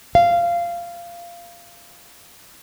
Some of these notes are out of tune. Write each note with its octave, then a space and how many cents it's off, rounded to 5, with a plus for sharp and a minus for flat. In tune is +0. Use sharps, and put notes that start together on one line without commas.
F5 -15